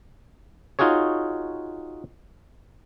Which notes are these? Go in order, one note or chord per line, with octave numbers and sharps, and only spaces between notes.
D#4 F4 F#4 G#4 C#5